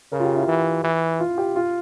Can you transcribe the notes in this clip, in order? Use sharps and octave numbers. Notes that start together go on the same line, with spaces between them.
C#3 A#4
F4
G4
E4
E3
E3
F4
G4
F4